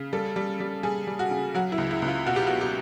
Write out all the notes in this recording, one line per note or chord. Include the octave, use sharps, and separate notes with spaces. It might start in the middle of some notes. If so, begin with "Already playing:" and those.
Already playing: C#3
G3 A4
G3
G3
G3 G#4
G3
F#4
C#3
F#3 F#4
E4
C#2
E4
C#2
F4
B2 F#4
G4
F#4
B2
G4